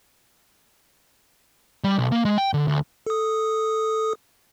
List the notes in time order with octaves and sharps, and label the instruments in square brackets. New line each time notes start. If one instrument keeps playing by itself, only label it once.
[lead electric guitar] G3
B1
A#3
G#3
G5
D3
D2
[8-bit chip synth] A4 D#6